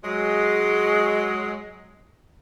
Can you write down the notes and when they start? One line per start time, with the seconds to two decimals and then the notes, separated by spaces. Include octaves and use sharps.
0.04 F#3 G#3